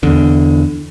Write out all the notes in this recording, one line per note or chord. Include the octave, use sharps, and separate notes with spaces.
E2 D3